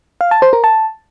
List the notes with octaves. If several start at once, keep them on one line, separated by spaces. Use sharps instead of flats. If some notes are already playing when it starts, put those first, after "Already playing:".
F5
A5
C5
A#4
A5